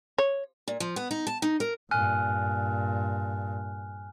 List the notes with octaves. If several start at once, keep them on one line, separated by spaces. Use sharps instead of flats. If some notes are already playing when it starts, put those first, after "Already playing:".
C#5
A#2
F3
B3
D#4
A5
D#4
A#4
G2 A#2 G#5 F6 F#6